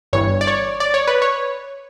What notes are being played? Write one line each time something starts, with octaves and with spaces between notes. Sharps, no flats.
G1 G2 E3 C#5
D5
C#5
D5
C#5
B4
C#5